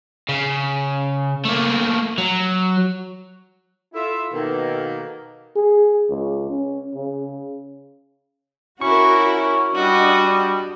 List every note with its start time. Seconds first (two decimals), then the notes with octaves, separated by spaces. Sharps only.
0.29 C#3
1.45 A3 A#3
2.18 F#3
3.94 E4 F4 A4 E5
4.34 B2 D#3 A#3
5.56 G#4
6.09 C#2
6.49 C#4
6.94 C#3
8.81 C#4 E4 F#4 A#4 C#6
9.75 G3 D4 F#4 D#5